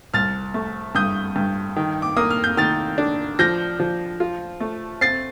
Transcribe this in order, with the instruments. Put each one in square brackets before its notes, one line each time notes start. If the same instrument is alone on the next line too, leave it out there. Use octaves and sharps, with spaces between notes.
[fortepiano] C2 [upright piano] F6 A6
[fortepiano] A3
[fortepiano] G2 [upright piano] D#6 G6
[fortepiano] G2
D#3
[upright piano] D6
[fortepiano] A#3 [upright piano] D#6
[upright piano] F6
G6
[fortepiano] D#3 [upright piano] F6 A6
[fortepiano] D4
[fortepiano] F3 [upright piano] G6 A#6
[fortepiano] F3
F4
A3
[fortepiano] C4 [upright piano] A6 C7